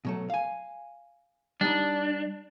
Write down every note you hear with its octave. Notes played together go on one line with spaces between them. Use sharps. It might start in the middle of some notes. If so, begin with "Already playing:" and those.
B2 F#3 A3
F5 G#5
G3 D4 D#4